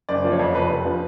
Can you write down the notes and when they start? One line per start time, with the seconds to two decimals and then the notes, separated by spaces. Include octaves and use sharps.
0.09 F#1 D5
0.24 F3
0.32 C#5
0.39 F2
0.55 F1 B4
0.70 F1
0.85 F3